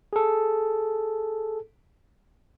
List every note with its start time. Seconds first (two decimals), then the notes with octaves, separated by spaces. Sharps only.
0.13 G#4 A4